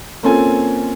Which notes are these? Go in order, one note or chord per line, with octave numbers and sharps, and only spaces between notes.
A#3 C4 C#4 F4 A4 G#5